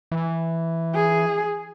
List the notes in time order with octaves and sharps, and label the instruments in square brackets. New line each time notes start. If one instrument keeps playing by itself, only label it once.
[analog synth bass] E3
[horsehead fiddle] G#4